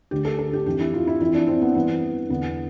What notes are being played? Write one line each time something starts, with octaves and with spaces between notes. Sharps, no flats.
D2 D3 G4
A4
A4
G4
F2 E3 G4
E4
F4
E4
F2 E3 E4
D4
C4
B3
G2 E3 B3
E2 D3 B3